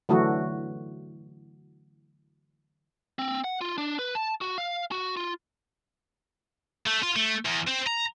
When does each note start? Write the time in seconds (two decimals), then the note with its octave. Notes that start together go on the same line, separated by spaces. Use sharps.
0.09 D3 E3 F#3 A3 F#4
3.19 C4
3.44 F#5
3.61 F4
3.78 D4
3.99 B4
4.15 A5
4.41 F#4
4.58 F5
4.91 F#4
5.17 F4
6.87 A3
7.03 F4
7.16 A3
7.45 E2
7.67 C4
7.86 A#5